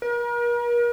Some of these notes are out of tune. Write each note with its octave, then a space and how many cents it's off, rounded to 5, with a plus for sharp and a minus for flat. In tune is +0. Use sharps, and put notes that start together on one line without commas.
A#4 +40